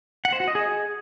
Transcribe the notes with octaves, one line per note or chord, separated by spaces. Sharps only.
F#5
C5
F#4
D#5
G#4